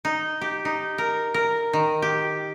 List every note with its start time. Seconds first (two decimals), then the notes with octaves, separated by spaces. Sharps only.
0.05 D#4
0.41 G4
0.65 D#4
0.98 A#4
1.34 A#4
1.73 D#3
2.02 G4